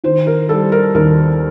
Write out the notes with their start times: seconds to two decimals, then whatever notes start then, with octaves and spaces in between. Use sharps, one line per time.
0.04 D#3 C5
0.27 A#4
0.49 G3 A4
0.72 A#4
0.95 D#2 A#4